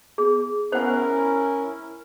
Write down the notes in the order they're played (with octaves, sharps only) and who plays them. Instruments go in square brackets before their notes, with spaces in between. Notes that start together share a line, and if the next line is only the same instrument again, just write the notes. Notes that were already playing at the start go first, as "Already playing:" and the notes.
[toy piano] G#4
[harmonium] C#4 E4 A#4 [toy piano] C5 F#5